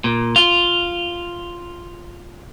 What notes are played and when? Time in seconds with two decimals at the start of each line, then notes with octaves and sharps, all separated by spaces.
0.04 A#2
0.36 F4